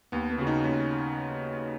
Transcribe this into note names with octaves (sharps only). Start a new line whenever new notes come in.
D#2 B3
B3
C#3 F#4
D#4
D#2 C#4